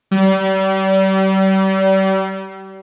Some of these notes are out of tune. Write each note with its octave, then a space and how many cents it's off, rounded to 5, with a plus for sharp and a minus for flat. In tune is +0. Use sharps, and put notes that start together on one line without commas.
G3 -35